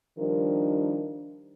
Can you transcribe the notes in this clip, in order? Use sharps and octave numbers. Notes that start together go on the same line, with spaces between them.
D#3 F3 G3 D4 D#4 A#4